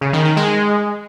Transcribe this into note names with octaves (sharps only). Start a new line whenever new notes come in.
C#3
D#3
D#3
G#3